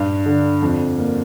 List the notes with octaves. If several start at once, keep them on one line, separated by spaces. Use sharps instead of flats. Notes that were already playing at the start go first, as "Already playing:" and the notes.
Already playing: G2
D3
F2
A#3